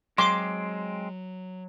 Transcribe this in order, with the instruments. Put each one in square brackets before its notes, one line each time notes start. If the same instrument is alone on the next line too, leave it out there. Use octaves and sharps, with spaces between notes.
[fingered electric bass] F#3 [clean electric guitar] G#3 C4 [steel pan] C6 D6